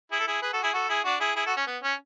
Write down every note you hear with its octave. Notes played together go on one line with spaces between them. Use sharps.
E4 G#4
A4
E4 G#4
G#4 B4
F#4 A4
E4 G#4
F#4 A4
E4 G#4
D4 F#4
E4 G#4
E4 G#4
F#4 A4
C#4
B3
C#4